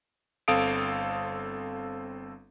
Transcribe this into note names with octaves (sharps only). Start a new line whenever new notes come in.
G1 C4 A4 F5 D#6 D7